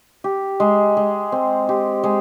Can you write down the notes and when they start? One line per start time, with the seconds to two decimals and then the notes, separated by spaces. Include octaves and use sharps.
0.24 G4
0.60 G#3
0.97 G#3
1.32 C4
1.69 G4
2.03 G#3